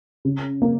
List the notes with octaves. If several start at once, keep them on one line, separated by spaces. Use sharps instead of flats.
C#3
A#3